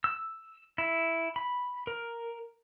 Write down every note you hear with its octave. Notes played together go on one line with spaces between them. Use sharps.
E6
E4
B5
A#4